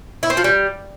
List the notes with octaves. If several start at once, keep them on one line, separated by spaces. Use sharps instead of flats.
E4
C4
F3
G3